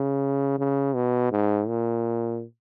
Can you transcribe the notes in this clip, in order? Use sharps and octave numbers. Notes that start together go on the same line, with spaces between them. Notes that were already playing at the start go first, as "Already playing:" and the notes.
Already playing: C#3
C#3
B2
G#2
A#2